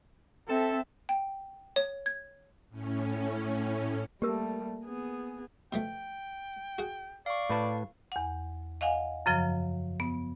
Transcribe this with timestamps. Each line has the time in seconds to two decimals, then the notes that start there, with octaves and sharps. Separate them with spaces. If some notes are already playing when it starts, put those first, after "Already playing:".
0.48 C4 A4 E5
1.09 G5
1.76 C#5
2.06 G#6
2.70 A2 C#4
4.22 G3 A3 A#3 G4 A#4
4.85 B3 G#4
5.73 B2 F3 A3 G5
6.78 F#4 G#4 F#5
7.26 D5 F5 C#6
7.50 A2 B4 A5
8.12 E2 F#5
8.81 D#5 F5 F#5 G#5
9.26 F#2 C#3 F3 F#3
10.00 B3